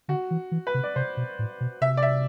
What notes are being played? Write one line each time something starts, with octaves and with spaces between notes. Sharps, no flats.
D3 F#4
E3
E3
B4
C3
D5
C3 C5
B2
A2
B2
C3 E5
D5
E5